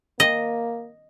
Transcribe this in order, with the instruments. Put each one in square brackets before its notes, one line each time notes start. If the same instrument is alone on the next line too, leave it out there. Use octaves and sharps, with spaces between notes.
[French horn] A#3 [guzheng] D#5